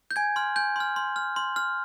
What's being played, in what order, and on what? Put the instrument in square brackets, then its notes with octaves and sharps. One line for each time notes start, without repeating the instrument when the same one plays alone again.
[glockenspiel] G6
G#5 G#6
C6 F6
G#5 G6
C6 F6
C6
F6
C6
F6